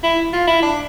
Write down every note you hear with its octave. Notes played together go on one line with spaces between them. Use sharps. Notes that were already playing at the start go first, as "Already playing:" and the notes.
E4
F4
E4
D4